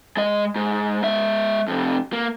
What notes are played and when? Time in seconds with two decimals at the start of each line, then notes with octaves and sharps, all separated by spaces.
0.17 G#3 D#5
0.56 G#2
1.03 G#3 E5
1.68 F2 C3
2.13 A#3